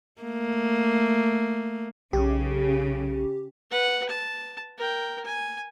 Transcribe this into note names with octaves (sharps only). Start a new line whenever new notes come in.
A3 A#3
B1 C#3 G4
B4 F#5
A5
A#4 G5
G#5